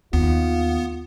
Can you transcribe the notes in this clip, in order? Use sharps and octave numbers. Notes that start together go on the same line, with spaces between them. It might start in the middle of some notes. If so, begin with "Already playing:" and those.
D#2 B3 F4